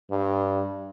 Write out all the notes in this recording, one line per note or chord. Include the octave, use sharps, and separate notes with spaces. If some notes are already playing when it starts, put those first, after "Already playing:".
G2